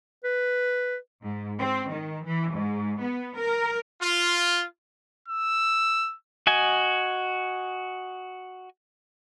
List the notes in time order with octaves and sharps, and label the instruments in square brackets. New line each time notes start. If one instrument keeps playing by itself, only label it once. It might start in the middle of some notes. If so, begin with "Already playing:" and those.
[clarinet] B4
[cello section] G#2
C4
D#3
E3
G#2
B3
A#4
[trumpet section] F4
[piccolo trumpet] E6
[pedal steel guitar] F#4 D#5 G#5